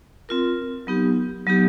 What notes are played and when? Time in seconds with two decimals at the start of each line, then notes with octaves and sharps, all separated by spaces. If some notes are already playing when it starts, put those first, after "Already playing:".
0.29 C4 F4 A#4
0.87 F#3 B3 D#4 G4
1.46 F#3 B3 D#4 G4